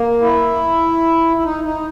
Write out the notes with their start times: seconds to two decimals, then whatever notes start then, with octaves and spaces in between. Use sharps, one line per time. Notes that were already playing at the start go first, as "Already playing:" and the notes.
Already playing: A#3
0.21 E4
1.37 E4
1.44 D#4
1.64 D#4